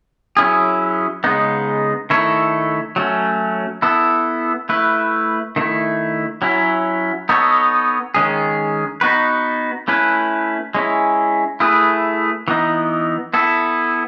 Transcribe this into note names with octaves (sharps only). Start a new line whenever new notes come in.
F#3 C#4 E4 G#4
C#3 G#3 B3 D#4
D#3 A3 E4 A4 C#5
F#3 A3 C#4
B3 E4 A4
A3 E4 B4
D#3 A3 E4
F#3 C#4 E4
B3 D#4 A4 C#5
D#3 G#3 C#4 G#4
B3 D#4 F#4 B4
A3 C#4 E4 B4
G#3 C#4 E4
A3 E4 G#4 B4
E3 B3 D#4
B3 E4 A4